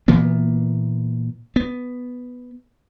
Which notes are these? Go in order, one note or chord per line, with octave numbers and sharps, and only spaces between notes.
A#2 E3 A#3 B3
B3